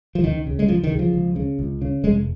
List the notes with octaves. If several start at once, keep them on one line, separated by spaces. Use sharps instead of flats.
F3
C#2 D#3
C#3
G#3
C#2 F3
D#3
C#3
F3
C#2
C#3
C#2
C#3
F1 G#3